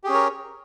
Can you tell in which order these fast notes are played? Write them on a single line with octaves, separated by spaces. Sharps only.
G4 G#4 C#4 C#5 A#4